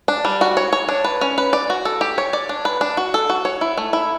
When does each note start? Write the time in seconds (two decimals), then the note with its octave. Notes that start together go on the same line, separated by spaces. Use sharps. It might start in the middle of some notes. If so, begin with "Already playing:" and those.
0.08 D4
0.25 G3
0.41 F#4
0.57 C#5
0.73 C#5
0.89 D4
1.04 B4
1.21 C#4
1.38 B4
1.53 D5
1.70 F#4
1.85 A4
2.01 G4
2.18 C#5
2.33 D5
2.49 D4
2.65 B4
2.81 D4
2.97 F#4
3.14 A4
3.30 F#4
3.45 C#5
3.61 E4
3.77 A3
3.93 E4